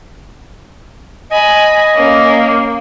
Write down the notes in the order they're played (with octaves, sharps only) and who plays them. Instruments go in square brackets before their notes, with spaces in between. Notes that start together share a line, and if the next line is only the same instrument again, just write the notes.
[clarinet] D#5 [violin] G#5 B5
[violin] A#3 C#4